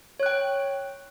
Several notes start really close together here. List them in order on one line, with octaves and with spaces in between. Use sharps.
C#5 F#6 G5